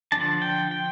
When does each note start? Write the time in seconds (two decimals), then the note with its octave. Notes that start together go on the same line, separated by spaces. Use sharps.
0.12 D3 F3 A#3 D4 A5
0.42 G5
0.71 G5